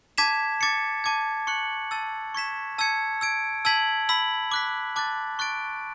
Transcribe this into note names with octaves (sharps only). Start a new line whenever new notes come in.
A5 D6 G#6 B6 E7
D6 A6 C#7
A5 D6 G#6
C#6 F#6 C#7 F#7
A5 E6 A6
C#6 G#6 B6 E7
A5 E6 G#6 C#7
E6 G#6 D7
A5 E6 G#6 B6 F#7
B5 E6 B6 F#7
D6 F#6 B6
A5 D6 F#6 A6
C#6 F#6 A6 D7